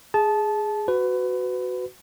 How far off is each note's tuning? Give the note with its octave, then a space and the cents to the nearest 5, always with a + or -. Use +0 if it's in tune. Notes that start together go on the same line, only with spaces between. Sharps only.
G#4 +0 A5 -20
F#4 +0 B4 +25